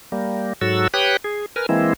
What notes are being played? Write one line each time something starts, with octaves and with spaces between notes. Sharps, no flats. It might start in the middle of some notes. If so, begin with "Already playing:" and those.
G3 A#3
G#2 F#3 F#4 A4 E6
G4 B4 C#5 G5 D#6 F#6
G#4
A#4 B4 G#5 F6
E3 G#3 A#3 C4 E4